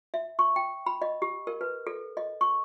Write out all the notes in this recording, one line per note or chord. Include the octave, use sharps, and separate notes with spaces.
E5
C#6
G5
B5
D#5
G4
A#4
B4
A4
D#5
C#6